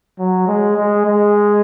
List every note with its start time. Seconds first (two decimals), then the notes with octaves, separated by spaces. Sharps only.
0.19 F#3
0.48 G#3
0.77 G#3
1.06 G#3